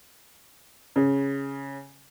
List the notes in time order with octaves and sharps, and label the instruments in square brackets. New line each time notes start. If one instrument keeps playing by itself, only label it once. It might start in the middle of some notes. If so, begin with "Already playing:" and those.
[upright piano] C#3